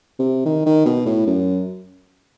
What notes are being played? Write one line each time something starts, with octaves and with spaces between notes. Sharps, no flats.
C3
D#3
D#3
B2
A2
F#2